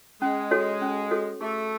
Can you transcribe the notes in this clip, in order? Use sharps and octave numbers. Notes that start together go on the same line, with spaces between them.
G#3 C#4
F#4 A4 C#5
C#4
F#4 A4 C#5
A3 G#4